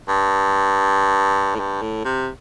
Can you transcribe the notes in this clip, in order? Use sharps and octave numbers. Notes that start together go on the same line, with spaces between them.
G2
A2
G2
A2
C3